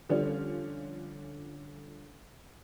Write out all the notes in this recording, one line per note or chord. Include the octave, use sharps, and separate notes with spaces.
D3 F3 G3 C#4